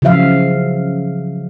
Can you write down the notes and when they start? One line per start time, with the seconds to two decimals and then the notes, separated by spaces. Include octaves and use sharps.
0.02 C#3 F3 F#3 E5 F5